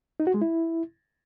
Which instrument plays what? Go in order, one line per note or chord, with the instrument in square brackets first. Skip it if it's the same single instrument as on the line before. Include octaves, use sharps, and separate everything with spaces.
[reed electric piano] D#4
F#4
G#3
E4